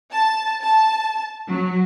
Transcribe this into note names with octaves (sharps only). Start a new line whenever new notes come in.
A5
A5
F#3